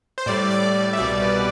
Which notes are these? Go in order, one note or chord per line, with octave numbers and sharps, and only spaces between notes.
C5
A2 G3 D5
D5
D5
E5
C2 B2 G3 D5
B4